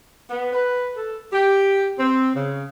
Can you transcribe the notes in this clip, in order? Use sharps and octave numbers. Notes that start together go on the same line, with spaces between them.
B3
B4
A4
G4
C4
C#3